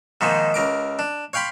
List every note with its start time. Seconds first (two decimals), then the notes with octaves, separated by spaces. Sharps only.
0.21 G#2 D#3 F3 A#3
0.54 C#2 A#4 D6
0.99 D4
1.33 C#5 F5 G5 B5 C6